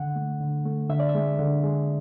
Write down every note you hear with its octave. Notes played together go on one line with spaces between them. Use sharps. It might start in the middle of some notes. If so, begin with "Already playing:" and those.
Already playing: D3 F#5
A3
D3
A3
D3 E5
D5
E5
G#3
D3
G#3